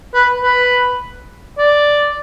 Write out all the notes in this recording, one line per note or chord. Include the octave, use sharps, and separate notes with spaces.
B4
B4
D5